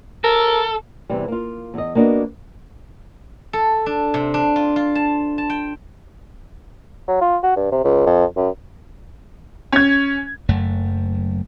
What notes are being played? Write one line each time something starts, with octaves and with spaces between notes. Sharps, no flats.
A4 A#4
E2 C3 E3 G3
A#3 F4
E2 D#5
A#3 B3 D4 F#4 D#5
A4
D4
C3
D4
F4
F4
A5
A5
G5
F#3
F4
F#4
G2
C3
C#2
F2
F#2
C#4 G#6
F#1 F#2 A3